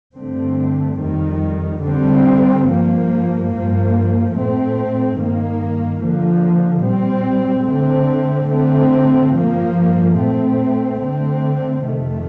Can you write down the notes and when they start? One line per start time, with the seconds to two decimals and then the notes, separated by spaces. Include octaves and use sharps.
0.16 G2 D3 A3 C4
0.99 F2 D#3 G3
1.82 D3 G3 C4
2.66 G2 F3 A#3
3.49 G2 F3 A#3
4.33 A#2 A3 C4
5.17 G2 D#3 A#3
6.00 D3 F3 A#3
6.83 A#2 G3 C4
7.67 D3 A3 C4
8.50 D3 A3 C4
9.33 G2 F3 A#3
10.17 A#2 A3 C4
11.00 D3 A3 C4
11.84 F2 C3 D#3 A3